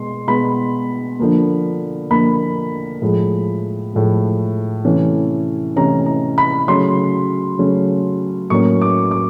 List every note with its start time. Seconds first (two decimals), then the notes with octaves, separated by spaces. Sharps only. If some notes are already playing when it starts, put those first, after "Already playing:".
Already playing: B2 G#3 C6
0.27 B2 G#3 B3 B5
1.19 D3 F3 A#3
2.10 D3 F3 A#3 B5
3.02 A2 F3 G#3
3.93 A2 F3 G#3
4.85 C3 E3 A3 C#4
5.76 C3 E3 A3 C#4 A#5
6.06 A#5
6.38 B5
6.68 C#3 F#3 A3 C#4 C6
7.59 C#3 F#3 A3 C#4
8.50 A2 F#3 A#3 C#4 C#6
8.82 D6
9.11 D6